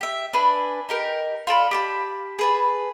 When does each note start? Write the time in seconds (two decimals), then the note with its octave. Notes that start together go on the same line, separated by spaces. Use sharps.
0.01 G4 E5
0.33 D4 B4 G#5
0.89 D#4 G4 A#4
1.47 F4 A4 D5 B5
1.71 G4 A5 B5
2.39 G#4 B4 A5